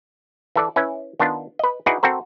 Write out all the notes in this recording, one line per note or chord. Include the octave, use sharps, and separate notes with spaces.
E3 A4 D5
C#4 E4 B4 E5
D#3 B3 D4 F4
B4 D#5
D#4 E4 F#4 G#4 B4 D5
C4 F#4 A4 A#4 C5